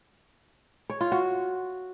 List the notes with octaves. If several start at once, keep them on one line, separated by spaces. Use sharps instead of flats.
C#5
F4
F#4